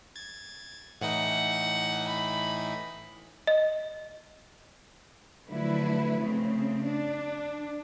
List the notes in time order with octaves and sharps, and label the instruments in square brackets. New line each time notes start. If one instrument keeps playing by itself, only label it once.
[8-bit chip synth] G#6 A6
[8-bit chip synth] A2 E3 D#4 [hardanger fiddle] F#5
[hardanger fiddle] B5
[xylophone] D#5
[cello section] D3 F3 F#3 A3 E4 B4
C#3 A3 C4
D4